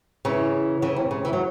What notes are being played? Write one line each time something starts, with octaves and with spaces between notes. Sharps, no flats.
C#3 E3
C#3 E3
C3
C#3
E3
F#3